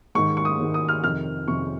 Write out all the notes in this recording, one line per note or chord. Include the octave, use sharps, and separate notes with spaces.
G#2 D#3 C#6
C#6
D#6
G#2 D#3
D#6
F6
F2 C3 D#3 F6
F2 C3 D#3 C#6